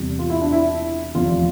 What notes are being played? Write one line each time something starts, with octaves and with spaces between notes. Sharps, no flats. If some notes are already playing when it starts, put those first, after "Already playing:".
Already playing: E1 E2 C3 G3
F4
E4
D4
E4
F1 E2 C3 F4